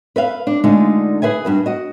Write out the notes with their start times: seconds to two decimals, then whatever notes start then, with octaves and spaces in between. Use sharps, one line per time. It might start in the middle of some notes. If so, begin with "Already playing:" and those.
0.16 B4 E5 F5
0.47 D4
0.64 D3 G#3 A3 D4 D#4 F4
1.22 G#4 B4 E5 G#5
1.45 G2 F#4 B4
1.66 F#4 D#5